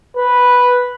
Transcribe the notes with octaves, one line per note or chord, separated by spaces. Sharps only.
B4